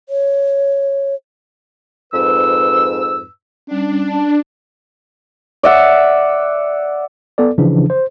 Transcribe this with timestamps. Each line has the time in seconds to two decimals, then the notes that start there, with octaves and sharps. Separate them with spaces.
0.09 C#5
2.13 F2 G#2 B4 E6
3.67 G3 C#4 D4
4.08 A5
5.63 D5 E5 F#5
7.38 B3 A4 D5
7.58 C#3 E3 F3 D4
7.90 C5